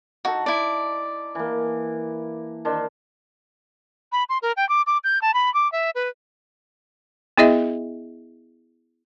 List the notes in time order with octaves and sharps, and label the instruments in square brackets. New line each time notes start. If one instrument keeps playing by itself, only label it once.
[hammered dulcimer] D#4 A4 [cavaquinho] F#4
[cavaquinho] E4 D5
[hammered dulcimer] E3 A#3
D#3 D4 C5
[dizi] B5
C6
A#4
G5
D6
D6
G6
A5
B5
D6
E5
B4
[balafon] B3 E4 G#4 D#5 E5